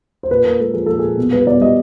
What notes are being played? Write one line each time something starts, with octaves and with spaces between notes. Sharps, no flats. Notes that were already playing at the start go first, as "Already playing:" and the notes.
C5
A#2 B4
A#2 A#4
G#3 A4
F3 G#4
A#2 A4
A#2 G#4
B2
G3 B4
B2 D5
G3 D#5